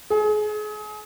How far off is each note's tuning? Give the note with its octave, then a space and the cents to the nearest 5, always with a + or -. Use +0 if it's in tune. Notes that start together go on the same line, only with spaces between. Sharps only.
G#4 +30